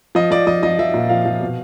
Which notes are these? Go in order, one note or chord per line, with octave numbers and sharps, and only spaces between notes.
F3 D#5
F3 D5
F3 D#5
F3 D#5
F3 E5
A#2
F3 F5
F3
B2